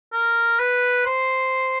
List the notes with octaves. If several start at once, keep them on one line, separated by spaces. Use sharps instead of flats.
A#4
B4
C5